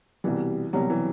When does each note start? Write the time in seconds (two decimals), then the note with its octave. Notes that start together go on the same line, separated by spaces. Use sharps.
0.24 C2 B2 E3 G3
0.73 C2 B2 F#3 G3
0.90 E3